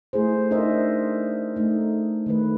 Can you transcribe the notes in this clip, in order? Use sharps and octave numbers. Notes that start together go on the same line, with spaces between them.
A3 E4 G#4 C5
D4 D#4 A#4 C5 D#5 E5
A3 D#4
D#3 A3 B4